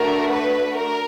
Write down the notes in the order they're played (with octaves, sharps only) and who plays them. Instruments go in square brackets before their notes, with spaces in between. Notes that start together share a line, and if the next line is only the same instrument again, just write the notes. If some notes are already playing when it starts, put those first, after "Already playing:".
Already playing: [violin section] A3 D4 F#4 A#4
B4
A#4